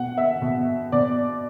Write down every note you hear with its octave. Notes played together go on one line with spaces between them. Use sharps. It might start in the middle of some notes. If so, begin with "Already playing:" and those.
Already playing: B2 F#5
E5
B2
B2 D5